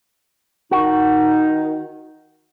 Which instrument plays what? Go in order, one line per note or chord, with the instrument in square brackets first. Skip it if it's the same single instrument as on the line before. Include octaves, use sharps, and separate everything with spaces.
[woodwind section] D#3 D#4 [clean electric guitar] F#4